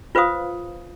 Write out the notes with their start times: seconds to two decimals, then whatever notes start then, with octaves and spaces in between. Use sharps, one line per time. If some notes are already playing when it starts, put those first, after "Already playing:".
0.15 F4 B4 C5 F5 D#6